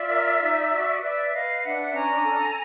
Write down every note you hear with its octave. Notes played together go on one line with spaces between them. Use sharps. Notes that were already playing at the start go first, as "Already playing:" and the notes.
Already playing: F4 D5 E5
A#4
D#4
F#4
B4 D5 E5
B4 D#5 F5
D4 E5 F#5
C#4 G#5 A#5
A4